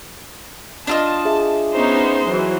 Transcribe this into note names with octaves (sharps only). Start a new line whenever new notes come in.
D4 F4 D#5 A5
G#4 E5
B3 C#4 D#4 C5
E3 F#3